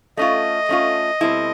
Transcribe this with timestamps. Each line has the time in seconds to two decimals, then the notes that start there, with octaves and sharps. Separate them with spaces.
0.17 A3 C#4 F4 D#5
0.69 A3 C#4 F4
1.21 B2 G3 C4 E4 A4